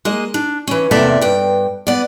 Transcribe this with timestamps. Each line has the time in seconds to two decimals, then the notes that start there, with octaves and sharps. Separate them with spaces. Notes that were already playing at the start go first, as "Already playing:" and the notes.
0.05 G#3 A#3 D#5
0.34 D4
0.67 E3 C#4
0.91 E2 C3 A#3 A4 D5 E5
1.21 G2 G5
1.87 B3 D5